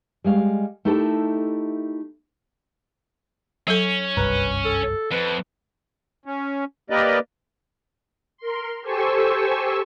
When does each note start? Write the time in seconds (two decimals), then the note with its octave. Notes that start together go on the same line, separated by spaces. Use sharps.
0.24 G3 G#3 F5
0.85 A3 D#4 E4 G4 A4 A#4
3.68 F#3 C#4 A4
4.17 F#1 C2 G2 B4 A#5
4.65 A4
5.12 F2 B4
6.25 C#4
6.90 A#3 G4 A#4 B4 D5 D#5
8.37 A#4 C6
8.82 G4 A4 C5 G#5 C#6 E6